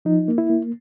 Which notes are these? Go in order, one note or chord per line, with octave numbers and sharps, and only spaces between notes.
F3 D#4
A#3
E4
A#3